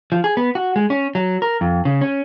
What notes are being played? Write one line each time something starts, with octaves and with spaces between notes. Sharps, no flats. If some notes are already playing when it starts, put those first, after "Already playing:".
F3
G#4
B3
F#4
G#3
C#4
F#3
A#4
F2
C#3
C#4